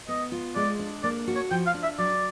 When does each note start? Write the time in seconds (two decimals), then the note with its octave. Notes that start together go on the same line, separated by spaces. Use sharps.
0.08 B3 D#5
0.32 F4
0.55 G#3 D5
0.79 D4
1.04 A#3 D5
1.27 F#4
1.35 C#5
1.51 F3 G5
1.66 F5
1.74 D4
1.83 E5
1.98 F#3 D5